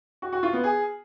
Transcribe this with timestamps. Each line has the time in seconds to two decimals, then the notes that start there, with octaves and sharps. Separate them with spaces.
0.22 F#4
0.33 F#4
0.43 F4
0.53 B3
0.64 G#4